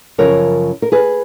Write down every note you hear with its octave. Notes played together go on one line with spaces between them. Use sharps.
F#2 C#3 F3 A#4 C#5
A#4
G#4 B4